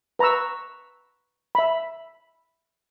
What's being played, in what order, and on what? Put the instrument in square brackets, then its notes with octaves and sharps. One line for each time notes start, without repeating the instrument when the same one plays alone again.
[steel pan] B4 A#5 B5 C#6 E6
E5 B5